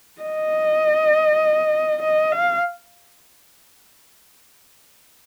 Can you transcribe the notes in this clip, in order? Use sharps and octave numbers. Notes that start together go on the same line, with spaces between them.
D#5
D#5
F5